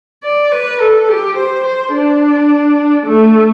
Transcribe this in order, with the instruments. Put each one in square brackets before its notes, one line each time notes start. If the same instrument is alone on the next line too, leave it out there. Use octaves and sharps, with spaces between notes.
[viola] D5
B4
A4
G4
C5
C5
D4
A3